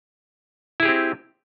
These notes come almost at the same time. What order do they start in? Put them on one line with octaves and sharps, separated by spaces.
E4 G#4 G4 C4